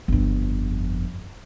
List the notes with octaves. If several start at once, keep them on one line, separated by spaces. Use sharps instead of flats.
G1 F2